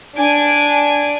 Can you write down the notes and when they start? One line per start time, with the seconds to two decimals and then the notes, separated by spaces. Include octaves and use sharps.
0.16 D4 G#5 D7